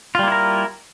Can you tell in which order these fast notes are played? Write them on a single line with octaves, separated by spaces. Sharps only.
F4 G3 A#3 E4 A#4